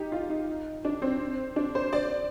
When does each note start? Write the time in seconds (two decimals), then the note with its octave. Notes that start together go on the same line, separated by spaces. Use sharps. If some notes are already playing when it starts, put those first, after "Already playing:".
Already playing: D#4 G4
0.12 F4
0.30 D#4
0.85 D4
1.02 C4
1.56 D4
1.75 C5
1.93 D5